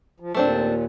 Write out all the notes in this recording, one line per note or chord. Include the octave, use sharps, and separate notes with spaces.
F3
D#2 A#2 A3 C4 D4